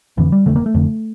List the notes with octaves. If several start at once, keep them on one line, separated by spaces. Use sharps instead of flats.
F1 F2 D3 E3
G3
F1 F2 D3 A3
A#3
A3
F1 F2 D3